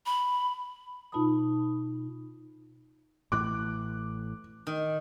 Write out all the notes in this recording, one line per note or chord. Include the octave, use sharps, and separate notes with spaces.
B5
B2 D#4 F4 A5 B5 D#6
A1 A2 E3 D6 F#6
D#3